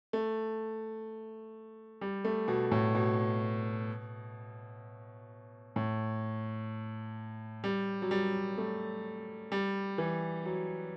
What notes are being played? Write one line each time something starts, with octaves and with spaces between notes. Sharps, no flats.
A3
G3
A3
B2
A2
B2
A2
G3
F#3
G3
A3
G3
E3
F#3